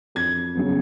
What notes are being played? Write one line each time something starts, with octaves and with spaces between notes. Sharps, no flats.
F2 G#6
C#3 F#3 B3